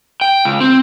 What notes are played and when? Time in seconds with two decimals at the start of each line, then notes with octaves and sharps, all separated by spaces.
0.21 G5
0.45 C#2
0.61 C4